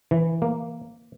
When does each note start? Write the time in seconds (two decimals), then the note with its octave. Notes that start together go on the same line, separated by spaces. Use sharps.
0.11 E3
0.42 A#3